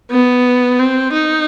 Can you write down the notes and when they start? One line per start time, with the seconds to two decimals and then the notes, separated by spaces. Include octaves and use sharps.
0.11 B3
0.79 C4
1.13 D#4